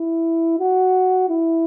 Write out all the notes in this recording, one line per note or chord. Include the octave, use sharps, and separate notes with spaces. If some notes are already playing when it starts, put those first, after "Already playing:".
Already playing: E4
F#4
E4